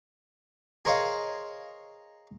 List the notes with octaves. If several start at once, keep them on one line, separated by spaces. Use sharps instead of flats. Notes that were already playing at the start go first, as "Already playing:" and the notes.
G#4 A#4 C5 C#5 D#5 F5